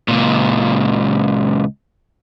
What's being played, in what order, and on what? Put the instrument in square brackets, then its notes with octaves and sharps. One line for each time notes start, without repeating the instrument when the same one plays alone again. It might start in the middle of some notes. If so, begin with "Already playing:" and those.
[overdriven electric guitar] C#2 A#2